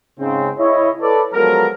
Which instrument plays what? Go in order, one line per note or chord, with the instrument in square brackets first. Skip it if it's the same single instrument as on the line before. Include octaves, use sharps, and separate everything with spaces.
[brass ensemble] G#2 C#3 C4
E4 C#5 D#5
A4 B4 D5
F3 F#3 G#3 B3 A4 A#4